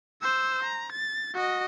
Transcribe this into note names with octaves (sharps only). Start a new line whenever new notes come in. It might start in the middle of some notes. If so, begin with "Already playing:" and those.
C5 E6
A#5
A6
F#4 D#5